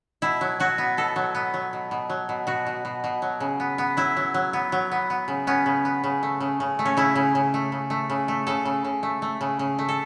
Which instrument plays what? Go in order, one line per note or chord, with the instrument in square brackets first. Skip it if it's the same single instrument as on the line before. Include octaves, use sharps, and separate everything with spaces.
[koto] B2 E4
F#3
F#3 F#4
B3
B2 A4
F#3
B3
F#3
B2
B2
F#3
B2
B2 F#4
B2
B2
B2
F#3
C#3
B3
B3
F#3 E4
F#3
F#3
B3
F#3
B3
B3
C#3
B3 C#4
C#3
B3
C#3
A3
C#3
C#3
A3
C#4
C#3 E4
C#3
C#3
A3
C#3
A3
C#3
A3
C#3 A4
C#3
C#3
A3
A3
C#3
C#3
A3
A4